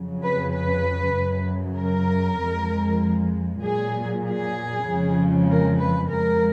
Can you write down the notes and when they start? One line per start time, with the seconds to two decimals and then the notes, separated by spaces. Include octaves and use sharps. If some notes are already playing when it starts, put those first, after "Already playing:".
Already playing: F2 C#3 F#3
0.24 B4
0.53 B4
1.16 F#2 C#3 F#3
1.77 A#4
2.39 F2 F3 G#3
3.62 A#2 F#3 G#4
4.24 G#4
4.86 F2 C#3 F3 G#3
5.48 A#4
5.78 B4
6.10 F2 F3 G#3 A#4